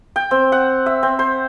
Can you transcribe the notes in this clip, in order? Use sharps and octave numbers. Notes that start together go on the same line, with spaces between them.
G5
C4
F#5
E5
C4
C5